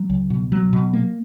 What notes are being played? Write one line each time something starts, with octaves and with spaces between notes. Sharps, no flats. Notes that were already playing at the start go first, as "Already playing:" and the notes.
Already playing: F#3
C#2
B2
F#3
B2
A#3